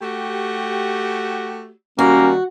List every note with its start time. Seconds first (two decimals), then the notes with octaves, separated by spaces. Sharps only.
0.01 A3 F#4 G4
1.99 D#3 G3 A#3 C#4 F#4